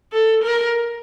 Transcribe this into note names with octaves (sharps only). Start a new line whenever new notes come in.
A4
A#4